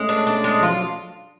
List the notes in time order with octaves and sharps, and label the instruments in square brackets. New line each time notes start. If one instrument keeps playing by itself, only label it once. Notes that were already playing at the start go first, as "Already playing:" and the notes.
Already playing: [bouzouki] G#3 [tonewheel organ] A3 C#4
[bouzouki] D4
D4
G#3
[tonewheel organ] F3 [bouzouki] F4
[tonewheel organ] F#3